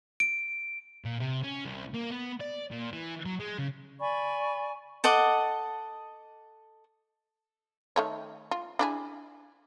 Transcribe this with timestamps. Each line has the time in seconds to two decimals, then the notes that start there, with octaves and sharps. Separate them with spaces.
0.20 D7
1.05 A#2
1.20 C3
1.44 C#4
1.65 C2
1.94 A#3
2.11 B3
2.41 D5
2.71 A#2
2.93 E3
3.26 F#3
3.40 G#3
3.58 C#3
4.00 D5 G#5 B5 C#6
5.04 A4 D#5 F#5 D6
7.96 D#3 A3 C#5
8.51 F4
8.79 D4 E4 G#4